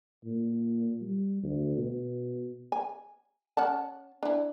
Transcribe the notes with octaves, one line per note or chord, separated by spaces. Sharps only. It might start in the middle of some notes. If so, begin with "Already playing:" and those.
A#2
G3
D2
B2
G#5
C#4 F#5 A5
D4 E4